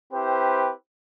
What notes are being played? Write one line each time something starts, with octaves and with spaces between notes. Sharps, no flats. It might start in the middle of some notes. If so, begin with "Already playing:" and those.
C4 E4 G4 B4 C5